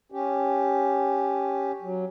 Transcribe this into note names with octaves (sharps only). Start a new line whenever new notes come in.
C#4 G4
F#3